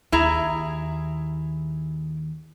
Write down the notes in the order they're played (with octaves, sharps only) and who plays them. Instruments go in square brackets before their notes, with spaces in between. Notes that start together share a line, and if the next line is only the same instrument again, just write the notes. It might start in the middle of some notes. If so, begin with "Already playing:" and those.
[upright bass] D#2 [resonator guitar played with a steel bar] E4 G#4 A#5